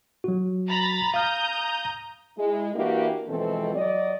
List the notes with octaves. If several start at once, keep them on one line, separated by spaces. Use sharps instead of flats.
F#3 F#4
A#5 B5 A6
F5 A#5 D#6 F6 G6
G#3 E4
E3 A#3 D4 E4 F#4 G4
B2 E3 F3 G#3 C4 A4
F#3 D5 D#5